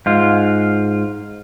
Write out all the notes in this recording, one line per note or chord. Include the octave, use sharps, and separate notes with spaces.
G#2 F4